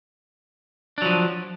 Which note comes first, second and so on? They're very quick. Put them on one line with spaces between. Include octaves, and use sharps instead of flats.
D4 F#3 F3